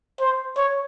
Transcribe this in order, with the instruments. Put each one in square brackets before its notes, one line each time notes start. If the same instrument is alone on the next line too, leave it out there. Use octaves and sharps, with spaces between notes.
[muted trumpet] C5
C#5